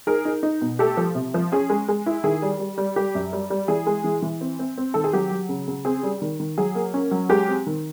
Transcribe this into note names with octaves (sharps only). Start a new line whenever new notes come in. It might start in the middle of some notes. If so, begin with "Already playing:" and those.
D#4 G#4 A#4
D#4
D#4
B2
A3 G4 A4
F3
C3
F3
C#4 G#4
G#3
G#3
E4
D#3 G#4
G3
G3
G3
G3 G4
F#2
G3
G3
E3 G#4
G#3
E3
E3
C4
C4
C4
D#3 A4
G#4
F#3 G4
F#3
C#3
C#3
C4 G#4
G3
D#3
D#3
F#3 G#4
A#3
C#4
F#3
G#3 G4
C4
D#3